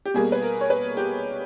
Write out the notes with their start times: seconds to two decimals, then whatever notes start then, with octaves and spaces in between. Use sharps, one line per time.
0.05 G4
0.14 B2 G3 A#3 G#4
0.32 B4
0.43 A#4
0.61 C#5
0.70 B4
0.97 G4